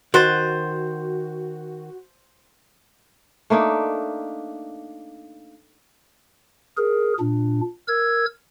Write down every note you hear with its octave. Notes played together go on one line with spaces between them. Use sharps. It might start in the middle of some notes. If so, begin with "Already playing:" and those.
D#3 F#4 C5 F#6 A6 D#7
A3 A#3 D4 D#4
G#4 A#4
A#2 D4
A#4 E6 G#6